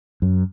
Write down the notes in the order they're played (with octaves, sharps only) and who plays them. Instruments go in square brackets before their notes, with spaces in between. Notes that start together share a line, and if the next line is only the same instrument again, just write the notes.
[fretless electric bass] F#2